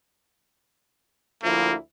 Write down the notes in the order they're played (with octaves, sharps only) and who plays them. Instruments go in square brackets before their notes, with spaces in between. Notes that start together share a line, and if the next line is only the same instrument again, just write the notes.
[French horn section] D2 F3 E4 [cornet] A#3